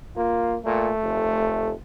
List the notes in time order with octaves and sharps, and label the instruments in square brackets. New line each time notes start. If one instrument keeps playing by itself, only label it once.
[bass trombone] A#3 [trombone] F4
[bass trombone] A#2 [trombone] A3
[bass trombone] F1